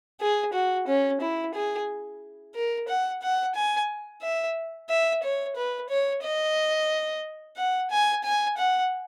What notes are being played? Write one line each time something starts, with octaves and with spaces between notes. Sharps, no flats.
G#4
F#4
C#4
E4
G#4
A#4
F#5
F#5
G#5
E5
E5
C#5
B4
C#5
D#5
F#5
G#5
G#5
F#5